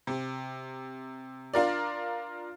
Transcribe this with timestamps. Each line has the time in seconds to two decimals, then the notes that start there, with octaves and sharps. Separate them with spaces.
0.07 C3
1.54 D4 F4 A#4 D5